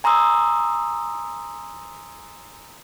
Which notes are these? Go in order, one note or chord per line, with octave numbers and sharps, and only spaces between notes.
G#5 A#5 C6 D#6 E6